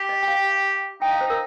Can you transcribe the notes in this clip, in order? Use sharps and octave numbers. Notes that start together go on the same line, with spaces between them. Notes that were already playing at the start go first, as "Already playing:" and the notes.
Already playing: G4
D#5
G5
F5
D#4 G5
F5
C5
D#4 A#4